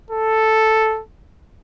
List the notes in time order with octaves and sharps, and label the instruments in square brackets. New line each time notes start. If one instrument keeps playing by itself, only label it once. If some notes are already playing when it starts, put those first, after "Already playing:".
[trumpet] A4